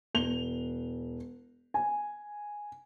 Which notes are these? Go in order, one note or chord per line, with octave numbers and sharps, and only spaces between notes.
E1 F7 G7
G#5